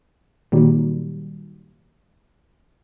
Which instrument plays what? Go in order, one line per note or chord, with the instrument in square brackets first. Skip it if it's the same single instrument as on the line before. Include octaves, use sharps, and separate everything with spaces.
[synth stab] A#2 D#3 F#3 G3